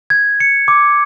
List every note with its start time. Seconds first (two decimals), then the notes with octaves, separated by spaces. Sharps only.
0.10 G#6
0.40 C#7
0.68 D6